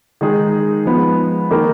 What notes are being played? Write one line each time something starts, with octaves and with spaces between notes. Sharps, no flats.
D#3 G#3 D#4 G#4
F3 G#3 B3
D#3 A#3 D#4 A#4